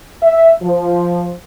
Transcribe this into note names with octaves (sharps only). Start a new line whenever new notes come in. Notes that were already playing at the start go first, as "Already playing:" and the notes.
E5
F3